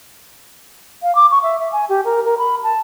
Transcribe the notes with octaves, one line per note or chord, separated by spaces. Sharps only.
F5
D6
C#6
E5
E5
G#5
G4
A#4
A#4
B5
A5